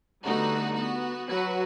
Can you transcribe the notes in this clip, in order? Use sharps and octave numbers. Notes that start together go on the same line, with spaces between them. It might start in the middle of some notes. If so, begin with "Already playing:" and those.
D3 G3 A3 B3 D#4 F#4
B3 F#4
F#3 F#4 B4